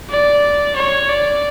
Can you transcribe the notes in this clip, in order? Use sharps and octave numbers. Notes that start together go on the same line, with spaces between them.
D5
C#5
D5